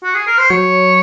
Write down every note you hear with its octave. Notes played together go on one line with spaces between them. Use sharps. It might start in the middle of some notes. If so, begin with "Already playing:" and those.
F#4
G#4
A#4
C5
F#3 C#5